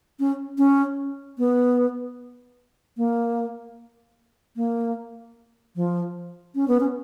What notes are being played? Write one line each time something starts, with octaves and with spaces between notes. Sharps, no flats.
C#4
C#4
B3
A#3
A#3
F3
C#4
B3
C#4